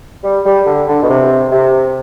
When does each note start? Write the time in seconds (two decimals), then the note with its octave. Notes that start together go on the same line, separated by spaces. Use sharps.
0.24 G3
0.46 G3
0.67 D3
0.88 D3
1.03 B2
1.09 C3
1.52 C3